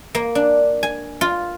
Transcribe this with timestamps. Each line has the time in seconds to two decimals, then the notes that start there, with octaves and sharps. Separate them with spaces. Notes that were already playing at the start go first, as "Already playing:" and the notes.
0.15 A#3
0.35 D4
0.83 G#5
1.21 F4